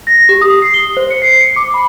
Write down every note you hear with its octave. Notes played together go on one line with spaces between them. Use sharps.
A#6
G4
D#6
C7
G7
C5
C#7
C7
C#7
D6
B5